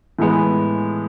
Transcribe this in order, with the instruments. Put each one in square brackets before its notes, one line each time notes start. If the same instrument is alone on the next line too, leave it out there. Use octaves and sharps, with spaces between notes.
[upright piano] A2 E3 G#3 B3